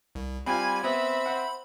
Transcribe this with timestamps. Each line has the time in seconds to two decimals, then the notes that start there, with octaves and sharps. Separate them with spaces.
0.15 C2
0.46 G3 C4 F4 G#5 B5
0.83 B3 C4 E5
1.26 C5 F#5